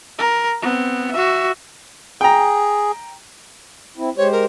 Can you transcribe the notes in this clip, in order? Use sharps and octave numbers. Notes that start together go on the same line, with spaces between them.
A#4
B3 C4
F#4 E5
G#4 G5 A#5
C4 E4
G#3 G4 C5 C#5
A#4